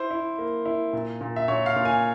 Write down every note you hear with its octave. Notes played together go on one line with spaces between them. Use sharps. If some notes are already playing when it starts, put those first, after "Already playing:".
Already playing: E4 C5
E4
A#3
E4
A#2
A#2
E5
A#2 C#5
F5
A#2
G#5